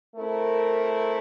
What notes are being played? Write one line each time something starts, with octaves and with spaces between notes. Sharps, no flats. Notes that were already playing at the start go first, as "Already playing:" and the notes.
A3 C4 E4 A#4